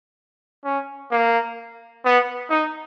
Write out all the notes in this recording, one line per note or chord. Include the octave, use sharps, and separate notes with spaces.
C#4
A#3
B3
D#4